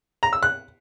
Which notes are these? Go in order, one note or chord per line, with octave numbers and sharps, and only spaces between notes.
A#5
E6
F#6